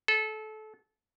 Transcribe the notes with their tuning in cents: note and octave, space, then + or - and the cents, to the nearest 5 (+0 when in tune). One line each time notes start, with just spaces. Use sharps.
A4 -25